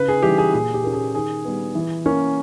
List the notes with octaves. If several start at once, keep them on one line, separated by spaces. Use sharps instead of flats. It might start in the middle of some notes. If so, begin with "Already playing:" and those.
Already playing: C#3 B4
G#4
E3 G3 G4
G#4
A#2 G#4
G4
A#3 C#4
G#4
D#3 G#4
G3 B3
E3
A#3 C#4